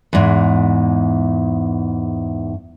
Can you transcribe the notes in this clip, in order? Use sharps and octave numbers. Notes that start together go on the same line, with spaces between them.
E2 G#2